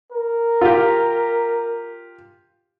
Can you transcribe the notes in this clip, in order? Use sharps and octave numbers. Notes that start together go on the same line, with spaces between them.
A#4
F4 G4